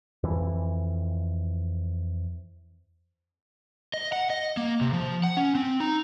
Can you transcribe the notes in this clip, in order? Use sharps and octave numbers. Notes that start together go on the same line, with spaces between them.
F2 E3
D#5
F#5
D#5
A#3
C3
F3
F#5
C#4
C4
D#4